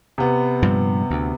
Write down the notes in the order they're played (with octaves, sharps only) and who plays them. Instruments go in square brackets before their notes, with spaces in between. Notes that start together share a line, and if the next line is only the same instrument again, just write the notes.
[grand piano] C3 B3
[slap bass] G2 A#2 F3
D2